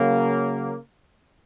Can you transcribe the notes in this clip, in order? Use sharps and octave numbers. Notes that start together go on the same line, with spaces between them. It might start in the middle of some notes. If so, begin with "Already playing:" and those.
Already playing: C#3 F#3 A#3